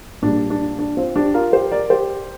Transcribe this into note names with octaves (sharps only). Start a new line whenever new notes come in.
A#1 A#2 G3 A#3 D4
D4
D4
C4 F4
D4 G4
F4 A#4
G4 C5
A#4 D5
G4 C5